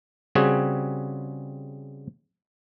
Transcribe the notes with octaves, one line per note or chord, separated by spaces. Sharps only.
C#3 G3 C4 F#4 G#4